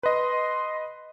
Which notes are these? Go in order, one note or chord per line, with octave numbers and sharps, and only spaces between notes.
B4 D#5 C6